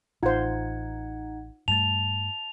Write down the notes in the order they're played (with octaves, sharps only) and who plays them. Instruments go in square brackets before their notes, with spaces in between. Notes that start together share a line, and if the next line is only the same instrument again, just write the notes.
[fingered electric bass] A1 [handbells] D#4 F#5 G#6 [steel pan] F4 C5
[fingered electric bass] G2 G3 A3 [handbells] A5 A6 [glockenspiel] F7